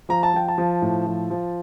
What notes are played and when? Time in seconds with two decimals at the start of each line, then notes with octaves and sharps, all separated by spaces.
0.09 F3 A#5
0.23 A5
0.34 F3 G5
0.48 A5
0.58 F3
0.82 A2
1.06 F3
1.30 F3